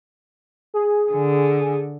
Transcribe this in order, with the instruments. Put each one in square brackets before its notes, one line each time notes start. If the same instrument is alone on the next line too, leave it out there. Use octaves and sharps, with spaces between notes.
[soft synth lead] G#4
[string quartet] D3